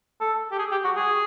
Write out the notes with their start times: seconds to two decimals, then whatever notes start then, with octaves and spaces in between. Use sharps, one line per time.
0.21 A4
0.52 G4
0.59 G#4
0.71 G4
0.85 F#4
0.97 G#4